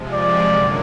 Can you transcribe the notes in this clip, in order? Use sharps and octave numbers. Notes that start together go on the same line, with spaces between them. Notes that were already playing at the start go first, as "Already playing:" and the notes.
Already playing: C3 F3 G#3
D5
F#2 D3 F#3 A#3